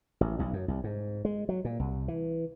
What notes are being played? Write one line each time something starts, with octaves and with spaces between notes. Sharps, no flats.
A1
B1
F#2
C2
G#2
G#3
F#3
A#2
C2
E3